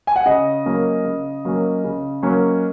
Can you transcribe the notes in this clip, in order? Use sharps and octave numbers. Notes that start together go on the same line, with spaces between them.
G#5
F#5
C#3 D#5
F#3 A#3 C#4
C#3
F#3 A#3 C#4
C#3
F#3 A#3 C#4